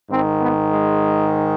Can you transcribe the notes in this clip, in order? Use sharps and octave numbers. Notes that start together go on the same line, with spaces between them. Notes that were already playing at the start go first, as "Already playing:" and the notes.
G#2 D#3 C4
B3
G#3